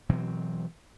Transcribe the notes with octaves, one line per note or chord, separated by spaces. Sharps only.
B2 E3 F#3 C4